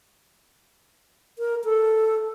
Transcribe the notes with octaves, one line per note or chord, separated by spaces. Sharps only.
A#4
A4